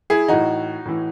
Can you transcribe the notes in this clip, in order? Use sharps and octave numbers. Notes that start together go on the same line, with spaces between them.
E4 G#4
A2 E3 D#4 F#4
A2 E3